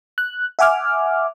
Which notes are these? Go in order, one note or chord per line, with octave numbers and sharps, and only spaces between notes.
F#6
E5 F#5 G#5 D6 F6